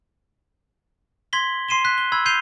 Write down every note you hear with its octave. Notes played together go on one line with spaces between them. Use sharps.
C6 G#6 A#6 B6 F#7 G7
C6 C7 D#7 E7 G7
F#6 B6
G7
B5 E6 G#6
G6 C7 D#7 F7 G7